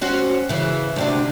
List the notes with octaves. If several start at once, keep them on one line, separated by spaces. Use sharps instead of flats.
C4 C#4 F#4
C#3 E3
D2 C3 D4